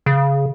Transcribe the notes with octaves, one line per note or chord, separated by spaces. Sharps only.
C#3